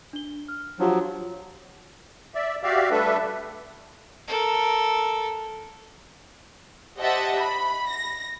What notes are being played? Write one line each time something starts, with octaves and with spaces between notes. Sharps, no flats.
D4 G7
F6
F3 F#3 D4 F4 G4
D5 E5
F#4 G4 D5 E5 F5
G3 A3 D4 A4 B4 E5
A4 A#4
G4 C5 D#5 E5 F#5 A5
B5
A#6